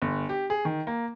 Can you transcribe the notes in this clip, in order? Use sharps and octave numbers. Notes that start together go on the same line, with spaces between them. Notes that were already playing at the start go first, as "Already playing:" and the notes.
G1
G4
G#4
D#3
A#3